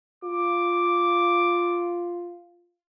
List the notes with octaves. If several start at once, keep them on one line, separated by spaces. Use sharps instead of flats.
F4 D6